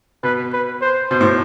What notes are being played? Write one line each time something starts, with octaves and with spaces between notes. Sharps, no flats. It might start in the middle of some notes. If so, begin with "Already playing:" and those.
B2 B4
B4
C5
B2 C5
A2